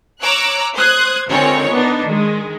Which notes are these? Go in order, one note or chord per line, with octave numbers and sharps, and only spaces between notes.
C#5 A#5 D6 E6 F#6
C5 D#6 F#6 G#6
D3 D#3 G#3 C4 F4 C#5
B3 D4 D#4
D#3 G#3